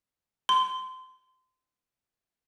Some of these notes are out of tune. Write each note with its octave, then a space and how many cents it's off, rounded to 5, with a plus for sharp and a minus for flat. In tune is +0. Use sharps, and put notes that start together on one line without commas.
C6 -25